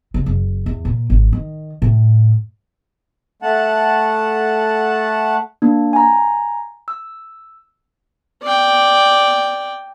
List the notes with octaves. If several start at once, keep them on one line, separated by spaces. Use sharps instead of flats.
C#3
F#1
E2
A#2
G#1
D#3
A2
A3 F#5 A5
A#3 D4
G#5 A#5
E6
D5 G5